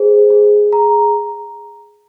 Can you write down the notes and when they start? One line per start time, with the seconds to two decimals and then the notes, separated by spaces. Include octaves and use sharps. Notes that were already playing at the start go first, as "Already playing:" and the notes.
Already playing: G#4 C5
0.30 G#4
0.73 A#5